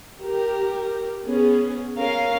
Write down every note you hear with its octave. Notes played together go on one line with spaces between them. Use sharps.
G4 A#4
B3 C#4 G#4
C#4 A#4 F5